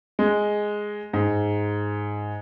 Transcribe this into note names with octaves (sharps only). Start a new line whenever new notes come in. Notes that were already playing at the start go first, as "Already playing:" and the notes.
G#3
G#2